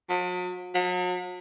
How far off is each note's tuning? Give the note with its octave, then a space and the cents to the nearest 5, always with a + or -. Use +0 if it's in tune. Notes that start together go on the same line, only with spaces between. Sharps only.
F#3 -45
F#3 -45